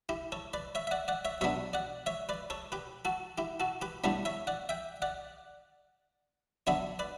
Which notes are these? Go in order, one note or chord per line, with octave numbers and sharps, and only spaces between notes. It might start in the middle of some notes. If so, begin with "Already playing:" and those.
E4 G4
A4 C#5
B4 D5
C#5 E5
E5
D5 F#5
D5 F#5
C#5 E5
B2 F#3 B3 D4 C#5 E5
D5 F#5
C#5 E5
B4 D5
A4 C#5
G4 B4
F#4 A4
E4 G4
F#4 A4
G4 B4
A2 G3 B3 D4 A4 C#5
C#5 E5
D5 F#5
E5 G5
D5 F#5
D3 F#3 B3 D4 C#5 E5
B4 D5